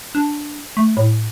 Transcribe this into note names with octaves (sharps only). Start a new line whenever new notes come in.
D4
A3
A2